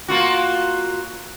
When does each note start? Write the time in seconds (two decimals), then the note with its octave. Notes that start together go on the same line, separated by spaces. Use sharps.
0.08 A#3 F4 F#4